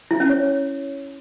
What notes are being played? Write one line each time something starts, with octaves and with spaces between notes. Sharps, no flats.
E4
C#4
C#5